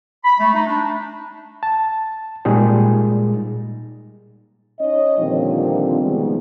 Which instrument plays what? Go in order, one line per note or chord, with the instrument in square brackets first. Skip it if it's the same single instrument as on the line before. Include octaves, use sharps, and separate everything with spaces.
[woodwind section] B5
A3
D#4
D4
[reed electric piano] A5
A#2 G3 G#3 D#4 G#4
[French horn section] C#4 D#4 C#5 D#5
A#2 D3 D#3 F3 G3 C4
C3 D#3 F3 G3 G#3 B3